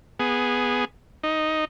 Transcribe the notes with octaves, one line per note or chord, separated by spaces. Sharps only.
B3 G#4
D#4